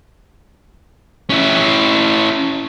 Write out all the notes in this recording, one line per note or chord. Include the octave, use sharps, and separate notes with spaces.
C#4 E4